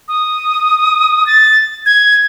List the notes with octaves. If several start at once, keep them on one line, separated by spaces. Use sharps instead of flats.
D#6
A6
G#6